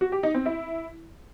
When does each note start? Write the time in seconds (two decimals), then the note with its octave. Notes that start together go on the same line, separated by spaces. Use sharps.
0.01 F#4
0.12 G4
0.23 D#4
0.34 C4
0.46 E4